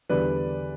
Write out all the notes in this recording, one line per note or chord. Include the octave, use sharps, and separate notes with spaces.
E2 D3 G3 B4 D5